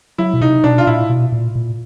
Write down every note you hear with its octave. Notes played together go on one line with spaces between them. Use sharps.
F#3 E4
B2
C3 D#4
B2 D4
F4
A#2 E4
B2
A#2
A#2